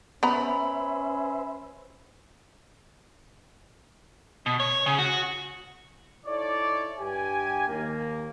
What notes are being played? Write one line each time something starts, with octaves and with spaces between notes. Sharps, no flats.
B3 C#4 B4 C5 E5 A#5 B5
B2
C#5
C#3
F#4
D#4 E4 A4 C#5 D5
G2 G4 G#5
D#2 A#3